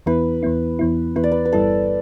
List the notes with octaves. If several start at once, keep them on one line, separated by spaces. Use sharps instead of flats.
E2 E3 B3 E4 B4
E2 E3 B3 E4
E2 E3 B3 E4
E2 E3 B3 E4 B4
D5
B4
B4
G1 G2 G3 E4 A4